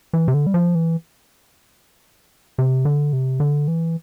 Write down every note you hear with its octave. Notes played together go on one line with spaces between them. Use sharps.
E3
C3
D3
G3
F3
E3
C3
D3
C3
D3
E3